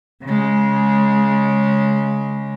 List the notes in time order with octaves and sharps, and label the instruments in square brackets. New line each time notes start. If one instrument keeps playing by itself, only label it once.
[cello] C#3 G#3